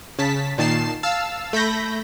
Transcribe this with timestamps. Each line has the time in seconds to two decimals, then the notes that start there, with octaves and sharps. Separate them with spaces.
0.19 C#3 A5 B6
0.58 A#2 D#3 A5 C7 E7
1.03 F5 A5 E6
1.53 A3 B5 G6 A#6